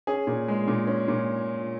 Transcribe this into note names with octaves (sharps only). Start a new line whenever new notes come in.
C#4 G#4
A#2
G#3
A#2
C#4
A#2